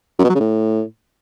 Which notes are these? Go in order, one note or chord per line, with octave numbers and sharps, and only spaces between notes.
F#2
B2
F#3
C#3
A2